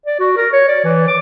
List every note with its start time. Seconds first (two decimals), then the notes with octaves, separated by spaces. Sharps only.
0.06 D5
0.20 F#4
0.37 A#4
0.53 C#5
0.68 D5
0.85 E3
1.08 D6